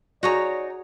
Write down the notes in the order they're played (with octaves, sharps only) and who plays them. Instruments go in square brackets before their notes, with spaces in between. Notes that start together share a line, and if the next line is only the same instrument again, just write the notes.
[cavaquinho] D#4 C#5 A#5 [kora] F#4 G#4 [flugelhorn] D5